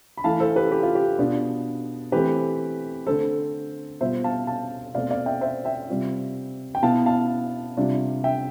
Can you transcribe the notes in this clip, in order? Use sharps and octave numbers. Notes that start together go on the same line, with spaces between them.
B5
E3 A3 E4 F5 A5
A4 C5
G4 B4
G4
F4
G4
B2 B3 D4 F4
E3 A3 C4 G4 B4
D3 A3 C4 A4 C5
B2 G3 B3 F4 C5 E5
F5 A5
F5 A5
B2 A3 C4 D5 F5
D5 F5
E5 G5
C5 E5
E5 G5
C3 G3 C4 F4
G5
B2 B3 E4 F5 A5
F5 A5
C3 G3 D4 F4
E5 G5